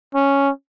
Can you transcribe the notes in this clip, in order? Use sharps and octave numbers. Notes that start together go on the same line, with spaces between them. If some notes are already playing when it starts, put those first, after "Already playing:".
C#4